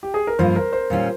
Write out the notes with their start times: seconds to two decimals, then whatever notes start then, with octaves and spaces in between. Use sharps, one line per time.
0.03 G4
0.14 G#4
0.27 A#4
0.39 G2 F3 A#3 F4 C5
0.56 A#4
0.73 C5
0.90 A#2 G3 C#4 F4